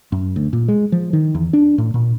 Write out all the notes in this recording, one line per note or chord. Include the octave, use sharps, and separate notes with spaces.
F#2
D2
A#2
G#3
F3
D#3
E2
D4
A2
A#2